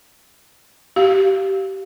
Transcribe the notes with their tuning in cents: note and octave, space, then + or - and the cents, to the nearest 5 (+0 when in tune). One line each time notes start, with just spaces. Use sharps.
G4 -25 F5 +0